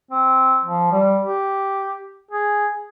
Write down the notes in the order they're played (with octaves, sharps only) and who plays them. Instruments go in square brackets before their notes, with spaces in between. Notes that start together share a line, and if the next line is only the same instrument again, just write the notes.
[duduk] C4
F3
G3
G4
G#4